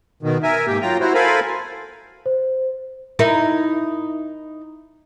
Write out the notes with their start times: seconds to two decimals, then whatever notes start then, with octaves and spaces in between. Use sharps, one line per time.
0.23 B2 D#3
0.43 A#4 E5 G#5
0.67 G#2 A#3 G4 G5
0.81 F#3 F4 G5 A#5
1.00 E4 F#4 C5
1.14 A4 A#4 C5 F5 G#5 B5
2.26 C5
3.19 D#4 E4 A#4